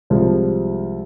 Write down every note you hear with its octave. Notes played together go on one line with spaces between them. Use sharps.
C2 F3 G3 G#3